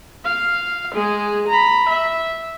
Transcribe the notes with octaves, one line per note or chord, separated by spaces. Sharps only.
F5
G#3 G#4
A#5 B5
E5